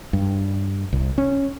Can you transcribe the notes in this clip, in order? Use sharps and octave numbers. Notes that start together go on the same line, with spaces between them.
G2
C2
C#4